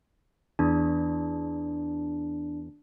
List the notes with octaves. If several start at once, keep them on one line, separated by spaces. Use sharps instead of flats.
E2 D4